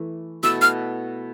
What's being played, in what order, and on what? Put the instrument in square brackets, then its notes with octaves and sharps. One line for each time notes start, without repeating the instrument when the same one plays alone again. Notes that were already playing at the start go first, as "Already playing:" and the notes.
Already playing: [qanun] E3 A3
[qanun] B2 A3 E4 A4 [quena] E6
[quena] F6